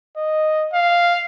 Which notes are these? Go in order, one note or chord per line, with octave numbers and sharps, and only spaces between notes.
D#5
F5